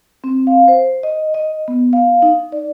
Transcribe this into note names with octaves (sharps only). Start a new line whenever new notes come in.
C4
F5
C5
D#5
D#5
B3
F5
D#4
D5